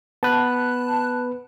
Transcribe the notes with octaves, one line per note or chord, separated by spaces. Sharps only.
B3 B4 A5 F#6